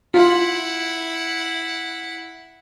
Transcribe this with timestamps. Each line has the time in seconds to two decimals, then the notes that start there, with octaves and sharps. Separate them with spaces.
0.14 E4 F4 F#5